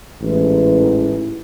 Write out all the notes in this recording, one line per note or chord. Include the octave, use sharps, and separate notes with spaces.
A1 G#2 E3